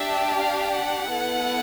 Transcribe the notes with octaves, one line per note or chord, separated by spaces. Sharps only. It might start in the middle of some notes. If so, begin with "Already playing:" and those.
Already playing: D4 G4 E5
F5
F#5
B3 E4 A4